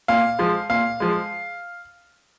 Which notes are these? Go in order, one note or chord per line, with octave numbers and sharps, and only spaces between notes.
A#2 F5
F3 G#3
A#2 F5
F3 G#3